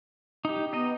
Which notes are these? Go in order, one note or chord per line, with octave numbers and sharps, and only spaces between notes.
D#4 G4
B3 D#4 D#5